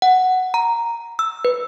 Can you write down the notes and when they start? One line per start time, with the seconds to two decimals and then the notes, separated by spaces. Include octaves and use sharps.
0.02 F#5
0.54 A#5
1.19 E6
1.45 B4